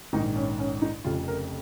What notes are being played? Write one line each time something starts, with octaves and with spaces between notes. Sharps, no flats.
A#1 G#2 D#3 D#4
C#4
C#4
D#4
F1 F2 C#3 F4
A#4